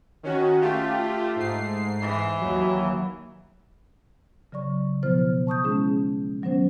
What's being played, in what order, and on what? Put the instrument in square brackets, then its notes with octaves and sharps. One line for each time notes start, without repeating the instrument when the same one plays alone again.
[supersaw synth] D#3 C#4 F#4
[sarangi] A3 [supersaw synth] F4 G4
[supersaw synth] G#2 C7
[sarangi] E3
[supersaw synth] D#2 F#3
[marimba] C#3 F#3 D5 C#6
B2 F3 B3 E4 C5 F6
A5 C#6 D#6 G6
G#3 C#4 E4 G#4
D#3 F#3 B3 C#4 C5